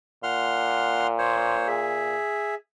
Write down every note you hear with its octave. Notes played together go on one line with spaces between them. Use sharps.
A#2 F#5 C6 F6
C5 C#5
G#4 E5